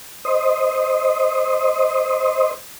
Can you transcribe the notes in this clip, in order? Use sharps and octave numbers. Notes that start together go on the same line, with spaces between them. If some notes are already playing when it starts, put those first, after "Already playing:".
C5 D#5